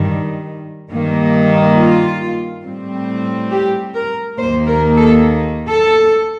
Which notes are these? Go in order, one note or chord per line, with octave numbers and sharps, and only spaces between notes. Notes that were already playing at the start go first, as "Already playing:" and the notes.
Already playing: G2 D#3 G3
G2 D#3 A#3
F4
A2 G3 C4
G4
A#4
D#2 D#3 A#3 C5
A#4
A4
A4